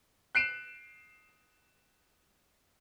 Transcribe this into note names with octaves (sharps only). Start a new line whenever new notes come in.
F#6 C7 D7 E7